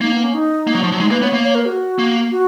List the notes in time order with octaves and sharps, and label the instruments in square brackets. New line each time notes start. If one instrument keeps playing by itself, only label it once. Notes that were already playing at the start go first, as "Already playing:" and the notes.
[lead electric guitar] A#3 [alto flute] D#4
[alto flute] B3
C#4
D#4
[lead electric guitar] A#3
F#3
F3
F#3
[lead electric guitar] G#3 [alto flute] D#4
[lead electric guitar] A#3 [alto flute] B4
[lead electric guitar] B3 [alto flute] C#5
[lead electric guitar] A#3
[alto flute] C#5
A#4
F#4
[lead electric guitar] A#3
[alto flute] F#4